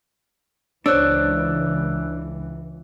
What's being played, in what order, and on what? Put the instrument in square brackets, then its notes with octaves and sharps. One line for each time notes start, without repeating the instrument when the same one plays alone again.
[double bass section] C#2 E3 [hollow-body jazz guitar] D4 [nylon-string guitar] C5 C#5 [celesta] E6 F#6